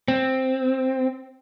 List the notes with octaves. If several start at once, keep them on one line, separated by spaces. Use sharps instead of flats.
C4